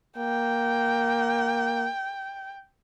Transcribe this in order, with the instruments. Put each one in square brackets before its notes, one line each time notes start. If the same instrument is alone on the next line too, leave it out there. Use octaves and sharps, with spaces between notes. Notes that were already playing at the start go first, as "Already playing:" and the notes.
[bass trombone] A#3 [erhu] G5